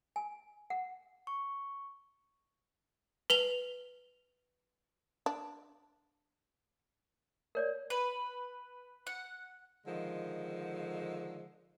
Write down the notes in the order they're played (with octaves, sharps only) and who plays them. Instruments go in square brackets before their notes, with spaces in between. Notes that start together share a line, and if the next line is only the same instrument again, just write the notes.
[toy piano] G#5
F#5
[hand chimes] C#6
[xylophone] B4 F7 G7
[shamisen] D4
[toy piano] A#4 C#5 D5
[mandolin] B4
F#5
[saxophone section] D3 D#3 F3 G#3